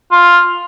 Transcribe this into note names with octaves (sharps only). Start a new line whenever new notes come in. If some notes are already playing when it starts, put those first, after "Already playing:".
F4